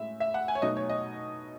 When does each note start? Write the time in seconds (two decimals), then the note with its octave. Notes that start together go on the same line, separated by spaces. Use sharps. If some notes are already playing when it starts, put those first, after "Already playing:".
Already playing: A2 G#3 C#4 E5
0.20 E5
0.34 F#5
0.48 G#5
0.55 C#5
0.62 B2 F#3 A3 D#4 D#5
0.77 C#5
0.89 D#5